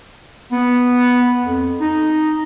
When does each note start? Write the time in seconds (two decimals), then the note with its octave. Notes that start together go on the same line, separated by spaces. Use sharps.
0.52 B3
1.44 F2
1.80 D#4